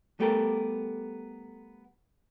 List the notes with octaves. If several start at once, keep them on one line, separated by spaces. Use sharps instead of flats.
G3 A3 B3 G4 A4 A#4